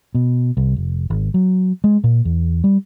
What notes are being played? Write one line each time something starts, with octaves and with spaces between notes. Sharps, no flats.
B2
C2
F1
G#1
F#3
G#3
A#2
E2
G3